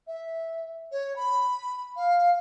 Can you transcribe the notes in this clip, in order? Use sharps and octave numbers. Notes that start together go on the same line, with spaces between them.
E5
C#5
B5
F5